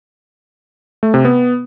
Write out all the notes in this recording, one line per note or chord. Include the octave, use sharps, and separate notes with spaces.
A3
C3
B3